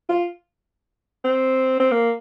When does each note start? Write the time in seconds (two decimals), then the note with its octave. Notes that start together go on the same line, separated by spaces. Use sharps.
0.09 F4
1.24 C4
1.80 C4
1.91 A#3